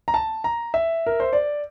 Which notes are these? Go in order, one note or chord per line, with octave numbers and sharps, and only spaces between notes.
A#5
A5
A#5
E5
A#4
C5
D5